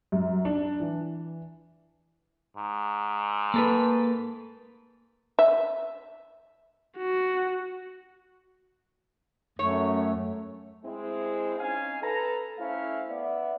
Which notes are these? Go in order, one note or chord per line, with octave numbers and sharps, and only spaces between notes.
F#2
D4
E3
G#2
A#3 A4 B4
E5
F#4
F#2 A3 C#5
G#3 C4 E4
C#4 D#4 F5 G#5
A4 B4 A#5
A3 C#4 E4 C5 E5 F5
B3 D5 E5